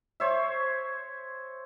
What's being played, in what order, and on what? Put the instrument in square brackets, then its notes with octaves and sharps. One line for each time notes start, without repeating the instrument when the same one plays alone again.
[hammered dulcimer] C5 C#5 E5